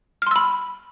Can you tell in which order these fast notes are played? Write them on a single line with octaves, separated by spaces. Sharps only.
F6 C6 E6 B5